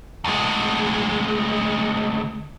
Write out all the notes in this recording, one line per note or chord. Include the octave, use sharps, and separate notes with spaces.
D2 G#3